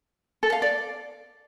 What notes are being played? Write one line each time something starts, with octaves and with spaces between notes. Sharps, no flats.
A4
F5
D5